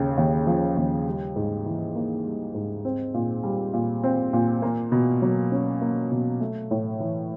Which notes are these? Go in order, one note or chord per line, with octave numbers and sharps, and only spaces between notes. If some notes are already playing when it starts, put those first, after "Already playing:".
Already playing: D#2 C#3
D#2
F3
D#2
G3
G#2
E3
A#3
G3
G#2
C4
A#2
G3
A#2
C4
A#2
A#3
B2
F#3
C#4
A#3
B2
A3
A2
E3